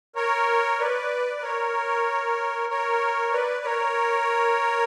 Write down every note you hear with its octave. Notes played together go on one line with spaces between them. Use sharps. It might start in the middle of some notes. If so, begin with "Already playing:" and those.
A#4 C#5
B4 D5
B4
A#4 C#5
A#4 C#5
B4 D5
A#4 C#5